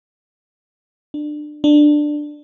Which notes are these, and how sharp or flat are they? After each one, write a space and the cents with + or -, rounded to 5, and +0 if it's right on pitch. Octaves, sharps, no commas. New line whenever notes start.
D4 +25
D4 +15